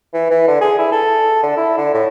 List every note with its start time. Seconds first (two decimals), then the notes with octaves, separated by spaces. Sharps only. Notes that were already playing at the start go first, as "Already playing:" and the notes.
0.13 E3
0.30 E3
0.48 D3
0.61 G#4
0.78 E4
0.92 A4
1.43 D3
1.57 E4
1.77 D3
1.94 A2